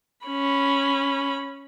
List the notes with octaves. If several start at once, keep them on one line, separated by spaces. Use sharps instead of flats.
C#4 B5